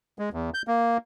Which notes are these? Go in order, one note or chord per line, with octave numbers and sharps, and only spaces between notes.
G#3
E2
G6
A#3